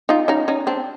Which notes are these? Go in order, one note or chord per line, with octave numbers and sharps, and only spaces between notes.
D#4 F4
C#4 D#4
C#4 D#4
C4 D4